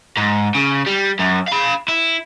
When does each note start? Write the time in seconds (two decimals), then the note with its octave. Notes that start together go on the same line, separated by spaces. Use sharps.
0.17 G#2
0.55 C#3
0.86 G3
1.19 F#2
1.48 F5 B5
1.88 E4